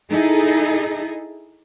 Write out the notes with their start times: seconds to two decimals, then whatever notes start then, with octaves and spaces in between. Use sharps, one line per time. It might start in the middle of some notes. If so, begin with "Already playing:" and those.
0.11 D#4 E4 G#4 A4 D#5